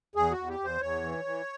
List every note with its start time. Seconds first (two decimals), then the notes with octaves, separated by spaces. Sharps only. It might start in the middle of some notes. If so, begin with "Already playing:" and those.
0.15 E2 G#4
0.32 F#4
0.38 E2
0.49 G4
0.60 E2 C5
0.81 E2 C#5
1.03 E3
1.24 E3